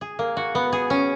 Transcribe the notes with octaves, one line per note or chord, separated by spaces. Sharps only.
G#4
A#3
F#4
B3
G#4
C#4